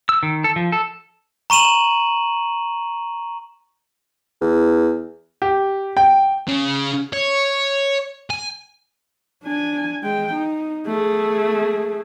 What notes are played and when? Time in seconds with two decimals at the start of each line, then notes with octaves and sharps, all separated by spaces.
0.09 E6
0.23 D#3
0.44 A4
0.56 F3
0.72 A4
1.50 A#5 C#6 D#7 E7 F#7
4.41 E2
5.42 G4
5.97 G5
6.48 C#3
7.13 C#5
8.30 G#5
9.44 D4 G#5
10.03 G#3 G5
10.34 D#4
10.87 A3 G#4